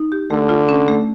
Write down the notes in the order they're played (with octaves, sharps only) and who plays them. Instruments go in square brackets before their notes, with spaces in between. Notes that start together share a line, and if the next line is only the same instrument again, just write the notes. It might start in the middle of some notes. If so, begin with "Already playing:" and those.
Already playing: [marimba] D#4
G4
[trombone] D3 [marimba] A3
[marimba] F4
C#4
A3